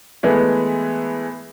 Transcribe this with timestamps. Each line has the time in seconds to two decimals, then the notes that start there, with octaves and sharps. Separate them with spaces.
0.23 E3 G#3 A3 B3